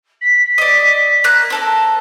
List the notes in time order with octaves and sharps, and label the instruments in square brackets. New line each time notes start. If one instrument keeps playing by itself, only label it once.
[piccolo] B6
[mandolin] D5 D#5
A#3 F#6
C4 A4 A#4